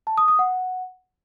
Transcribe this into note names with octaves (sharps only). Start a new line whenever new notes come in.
A5
D#6
D#6
F#5